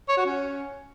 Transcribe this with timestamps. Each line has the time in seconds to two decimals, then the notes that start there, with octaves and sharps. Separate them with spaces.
0.09 C#5
0.17 F#4
0.26 C#4